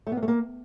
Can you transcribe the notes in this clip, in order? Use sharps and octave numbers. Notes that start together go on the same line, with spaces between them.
A3
B3
A#3
A3
A#3